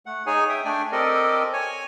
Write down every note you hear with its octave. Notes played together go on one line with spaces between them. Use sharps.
A3 F#5
D#4 G#4 C#5 G#5
E5 G5 D#6
A3 D4 D5 G5 G#5
C4 G4 A4 A#4 D5 D#5
C#5 G#5